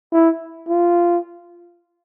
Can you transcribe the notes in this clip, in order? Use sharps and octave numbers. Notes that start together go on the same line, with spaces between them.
E4
F4